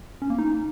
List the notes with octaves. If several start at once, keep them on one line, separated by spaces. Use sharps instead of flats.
C#4
A#3
D#4